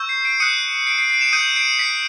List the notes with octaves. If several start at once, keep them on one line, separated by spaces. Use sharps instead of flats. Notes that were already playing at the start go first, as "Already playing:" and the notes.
Already playing: C#6 E6 G6
C7
C7 D7
D#6 F#6 C#7 D#7
C7 D7
C7 D7
C7 D7
D7 E7
D#6 G6 C#7 D#7
C7 D7
B6 C#7